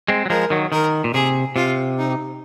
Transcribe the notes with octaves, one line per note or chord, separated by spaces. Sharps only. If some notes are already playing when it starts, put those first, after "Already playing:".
G#3 C4
F#3
F3 G#3 A#4
D#3 F#3
D#3 A#4
A#2
C3 G#4
C3 F4
D#4